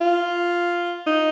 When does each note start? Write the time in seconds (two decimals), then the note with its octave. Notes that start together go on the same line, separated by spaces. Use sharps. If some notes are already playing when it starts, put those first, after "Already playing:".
0.01 F4
1.06 D#4